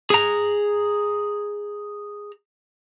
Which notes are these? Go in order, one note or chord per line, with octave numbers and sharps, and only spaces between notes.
G#4 A#5